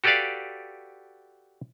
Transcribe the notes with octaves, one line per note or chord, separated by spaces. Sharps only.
F#4 G4 A4 B4 D5 F5